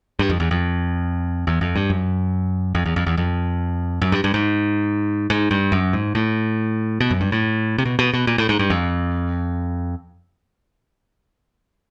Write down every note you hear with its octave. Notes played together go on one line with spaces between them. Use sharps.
G2
F2
E2
F2
E2
F2
G2
F#2
F2
E2
F2
E2
F2
F#2
G2
G2
G#2
G#2
G2
F#2
G#2
A2
B2
F#2
G2
A2
C3
B2
B2
B2
A#2
A2
G#2
G2
F2